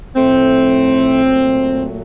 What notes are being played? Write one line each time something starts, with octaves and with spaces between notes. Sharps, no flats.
A2 F3 A3 C4
A#2 F#3 A3